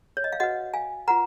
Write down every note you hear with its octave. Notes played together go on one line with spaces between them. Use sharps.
C#5
D#5
F5
F#4 B4 D#5 F#5
F5 G#5
F4 B4 F#5 A#5